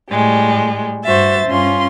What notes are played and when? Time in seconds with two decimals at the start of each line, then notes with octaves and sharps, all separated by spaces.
0.11 A2 G3 G#3
1.05 G2 F#4 C5 E5 A6
1.46 G2 C#4 F4 C6